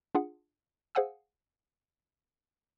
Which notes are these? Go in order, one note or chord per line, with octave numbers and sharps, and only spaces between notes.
D4 F4 G#4 F#5
G#4 C5 F5 F#5 G#5 E6